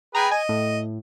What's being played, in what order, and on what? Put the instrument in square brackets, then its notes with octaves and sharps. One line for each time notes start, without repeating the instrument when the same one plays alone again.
[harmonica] G#4 B4 G5 [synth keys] A#5
[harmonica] D#5 [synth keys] G#5
[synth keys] A2